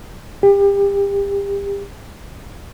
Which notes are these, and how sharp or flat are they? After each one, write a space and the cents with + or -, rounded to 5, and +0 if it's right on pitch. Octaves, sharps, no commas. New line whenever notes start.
G4 +30